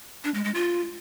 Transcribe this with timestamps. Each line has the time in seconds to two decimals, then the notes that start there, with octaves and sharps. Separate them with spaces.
0.24 D4
0.34 G#3
0.44 G#3
0.54 F4